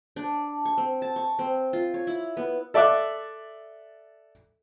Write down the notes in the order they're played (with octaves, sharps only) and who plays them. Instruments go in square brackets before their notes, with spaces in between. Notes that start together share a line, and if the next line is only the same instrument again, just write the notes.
[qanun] D4
C#6
C4
A5
C#6
C4
F4
C#5
E4
B3
[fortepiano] A4 D5 E5 D6 E6 F#6